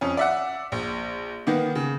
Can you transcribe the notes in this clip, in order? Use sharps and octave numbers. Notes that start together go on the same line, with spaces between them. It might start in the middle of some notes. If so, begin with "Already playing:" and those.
F2 C#4
D5 E5 F#5
A#1
D#3 A#3 B3
C#3